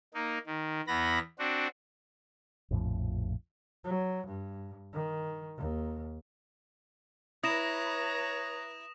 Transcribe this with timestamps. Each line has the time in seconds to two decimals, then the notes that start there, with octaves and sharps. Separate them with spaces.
0.14 A#3 D#4
0.46 D#3
0.87 E2 B3 B5 A#6
1.39 C4 D4 F#4
2.71 A#1 F2 A2 F3
3.85 F#3
4.28 G2
4.93 D#3
5.58 D#2
7.44 E4 B4 C#5 A#5 D#6 A#6 E7